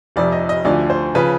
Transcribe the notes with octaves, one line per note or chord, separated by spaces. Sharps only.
F1 F2 C3 D5
D#5
D#5
D2 D3 F3 D5
C5
C#3 F3 B4